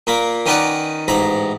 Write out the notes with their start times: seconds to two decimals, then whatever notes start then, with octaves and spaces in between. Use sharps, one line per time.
0.07 A#2 A#3 B5
0.46 D#3 C#4 D#4 B4 D5 F#5
1.08 A1 G#2 A#5 B5